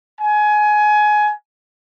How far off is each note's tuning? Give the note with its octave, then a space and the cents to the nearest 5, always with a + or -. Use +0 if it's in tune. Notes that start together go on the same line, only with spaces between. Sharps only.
G#5 +20